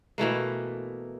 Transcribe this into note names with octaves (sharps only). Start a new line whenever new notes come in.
B2 E3 A3 A#3